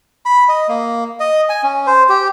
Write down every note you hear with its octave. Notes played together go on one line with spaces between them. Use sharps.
B5
D#5
A#3
D#5
G#5
C#4
C5
G4